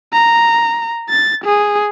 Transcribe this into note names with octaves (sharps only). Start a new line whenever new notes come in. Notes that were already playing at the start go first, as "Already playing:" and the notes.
A#5
A6
G#4